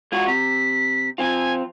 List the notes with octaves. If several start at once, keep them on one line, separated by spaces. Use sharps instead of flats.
G#3 F4 F#4 G#6
C3 B6
F3 C4 F4 G#5